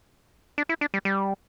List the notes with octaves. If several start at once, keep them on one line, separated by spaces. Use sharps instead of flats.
D4
E4
D4
G3
G3